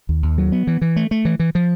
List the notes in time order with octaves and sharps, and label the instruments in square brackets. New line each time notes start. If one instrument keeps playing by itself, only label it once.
[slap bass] D#2
D#2
F#3
B3
E3
E3
A3
A3
E3
E3
F3